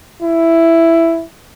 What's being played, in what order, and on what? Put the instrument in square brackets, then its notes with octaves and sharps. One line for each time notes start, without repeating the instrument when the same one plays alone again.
[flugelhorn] E4